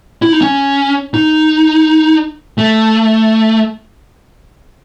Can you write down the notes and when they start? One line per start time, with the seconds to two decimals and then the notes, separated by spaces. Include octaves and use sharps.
0.22 E4
0.32 D#4
0.41 C#4
1.14 D#4
2.58 A3